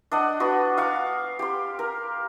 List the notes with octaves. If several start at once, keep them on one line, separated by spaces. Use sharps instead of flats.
D4 D#5 F#5
B3 F#4
F5 C#6 D6
G4 C6
A#4